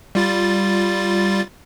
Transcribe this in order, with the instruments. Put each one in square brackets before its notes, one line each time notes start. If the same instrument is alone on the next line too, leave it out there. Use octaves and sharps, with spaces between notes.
[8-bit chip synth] G3 F4 A6